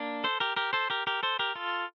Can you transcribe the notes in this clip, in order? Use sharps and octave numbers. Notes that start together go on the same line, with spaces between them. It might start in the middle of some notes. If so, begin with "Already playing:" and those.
Already playing: A#3 D4
A4 C5
G4 A#4
G4 A#4
A4 C5
G4 A#4
G4 A#4
A4 C5
G4 A#4
F4 A4